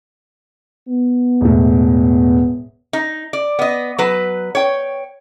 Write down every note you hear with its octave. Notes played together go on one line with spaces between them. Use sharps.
B3
E1 A2
D#4
D5
B3 D#5
F#3 B4
C#5 G5